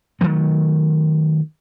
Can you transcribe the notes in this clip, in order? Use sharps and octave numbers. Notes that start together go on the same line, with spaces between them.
D#3 E3 F#3 A3